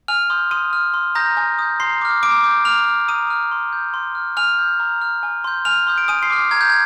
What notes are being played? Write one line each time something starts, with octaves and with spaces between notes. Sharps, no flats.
G#5 F6 F7
C6 D#6 G6
C6 D#6 D#7
F6
C6
A#5 D#6 G6 A#6
G#5
D#6 G6
A#5 C6 C7
D6 F6
A#5 D6 D7
D6 G6
A#5 F6 F7
F6
A#5 D#6 D#7
F6
C6
G6
C6
F6
G#5 F6 F7
D#6 G6
A#5
F6
G#5
C6 G6
G#5 F6 F7
C6 D#6 G6
D7
G#5 D#6 D#7
C6 C7
D6 F6
A#5 G#6
G6
G#6